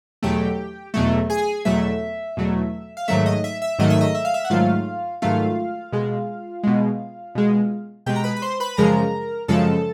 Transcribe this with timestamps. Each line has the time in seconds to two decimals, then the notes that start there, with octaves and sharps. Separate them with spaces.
0.23 E2 B2 F#3 A3 G4 G5
0.94 E2 B2 F#3 A3
1.30 G#4 G#5
1.65 E2 B2 F#3 A3 E5
2.37 E2 B2 F#3 A3
2.97 F5
3.08 G#2 D#3 F#3 A3 E5
3.26 D#5
3.44 E5
3.62 E5
3.79 G#2 D#3 F#3 A3 D#5
3.90 E5
4.01 D#5
4.15 E5
4.25 F5
4.34 E5
4.45 F#5
4.50 G#2 D#3 F#3 A3 F4 F5
5.22 G#2 D#3 F#3 A3 F4 F5
5.92 B2 G#3
6.63 B2 G#3
7.35 B2 G#3
8.06 B2 G#3 G4 G5
8.16 A#5
8.24 B4 B5
8.36 B5
8.42 C5 C6
8.60 B4 B5
8.77 F#2 C#3 F3 G#3 A#4 A#5
9.48 F#2 C#3 F3 G#3 A4 A5